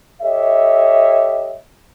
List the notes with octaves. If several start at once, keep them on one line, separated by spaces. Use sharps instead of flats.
G4 A4 C#5 D#5 E5